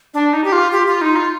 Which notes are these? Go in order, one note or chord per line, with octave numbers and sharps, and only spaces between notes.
D4
D#4
G4
F4
G4
F4
D#4
F4